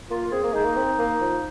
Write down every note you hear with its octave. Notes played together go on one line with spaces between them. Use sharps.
A#3 F4
C4 G#4
A#3
G#3 D#4
A#3
C4
A#3
F3